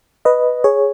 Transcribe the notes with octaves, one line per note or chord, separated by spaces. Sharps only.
B4 D#5
G#4 C#5